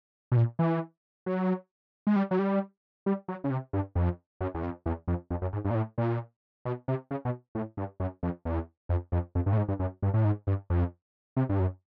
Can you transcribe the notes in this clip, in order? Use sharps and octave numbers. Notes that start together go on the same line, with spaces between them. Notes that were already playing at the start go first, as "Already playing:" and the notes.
B2
A#2
E3
F#3
G#3
G3
F#3
G3
G3
F#3
C#3
C3
G2
F2
F#2
E2
F2
E2
F2
F2
F#2
G#2
G2
A#2
A2
A#2
B2
C3
C#3
B2
A2
G2
F#2
F2
E2
F2
F2
F2
G2
A2
G#2
G2
F#2
G2
A2
G#2
G2
F2
C3
G2
F#2